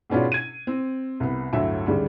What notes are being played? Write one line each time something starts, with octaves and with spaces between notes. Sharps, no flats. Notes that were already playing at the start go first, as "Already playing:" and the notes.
G#2 B2 B3 C#4 D4 F4
G#6 D#7
C4
C2 B3
G1 D2 A2 F#3 E5
D2 G#2 C#3 G3